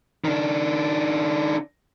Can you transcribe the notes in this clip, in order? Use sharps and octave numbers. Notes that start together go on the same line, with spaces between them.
D#3 D4